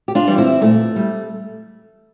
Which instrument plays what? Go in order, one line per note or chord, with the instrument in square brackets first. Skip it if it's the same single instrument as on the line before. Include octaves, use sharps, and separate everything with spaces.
[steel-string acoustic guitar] G4
D4 F4
E3 G3
C4 E4
A#2 A3
G3